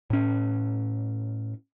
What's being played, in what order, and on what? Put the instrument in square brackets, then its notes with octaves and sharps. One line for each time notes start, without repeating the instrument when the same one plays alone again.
[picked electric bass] A2 C#4